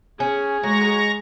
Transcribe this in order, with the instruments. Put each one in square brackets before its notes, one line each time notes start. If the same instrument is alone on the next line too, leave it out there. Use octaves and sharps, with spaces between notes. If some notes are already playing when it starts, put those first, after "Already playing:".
[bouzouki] C#4 [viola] G#4
[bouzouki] F#3 [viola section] G#3 [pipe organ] A#5 C#6 A#6